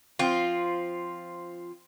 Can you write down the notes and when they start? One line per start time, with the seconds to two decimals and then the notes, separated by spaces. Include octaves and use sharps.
0.19 F3 C4 F4